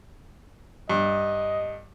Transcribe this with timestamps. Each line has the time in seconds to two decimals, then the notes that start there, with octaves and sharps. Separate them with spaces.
0.90 G2 D#5